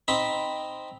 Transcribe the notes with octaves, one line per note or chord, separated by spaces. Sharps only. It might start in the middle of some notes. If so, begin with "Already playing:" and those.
C4 D#4 B5